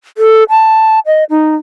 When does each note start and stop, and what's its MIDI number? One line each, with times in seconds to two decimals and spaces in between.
0.18 0.44 69
0.50 0.99 81
1.06 1.24 75
1.30 1.55 63